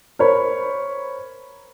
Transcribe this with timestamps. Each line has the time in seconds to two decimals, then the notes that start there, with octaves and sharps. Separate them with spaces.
0.19 A#4 C5 C#5 B5